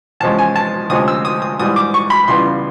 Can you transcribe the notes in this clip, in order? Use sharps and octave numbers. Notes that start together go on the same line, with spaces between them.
E2 C3 F3 G#3 C#4 A5
G#5
A5
D2 C3 F3 G#3 C#4 D#6
E6
D#6
D#6
G#2 E3 G3 D#6
D6
C#6
B5
C#2 C#3 E3 G3 B3 C6